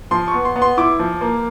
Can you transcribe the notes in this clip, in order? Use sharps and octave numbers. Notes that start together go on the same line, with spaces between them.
F3 C6
C#6
B3
C6
B3
C6
E4 D6
F3
A#3